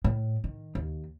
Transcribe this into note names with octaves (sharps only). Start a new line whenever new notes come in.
A2
D#3
D#2